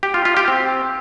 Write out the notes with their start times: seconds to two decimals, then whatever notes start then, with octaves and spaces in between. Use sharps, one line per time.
0.03 G4
0.14 F4
0.25 F4
0.37 G4
0.48 C4